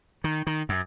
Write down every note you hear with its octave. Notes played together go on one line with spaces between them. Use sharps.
D#3
D#3
F#2